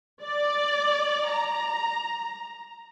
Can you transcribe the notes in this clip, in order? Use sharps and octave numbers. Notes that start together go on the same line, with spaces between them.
D5
A#5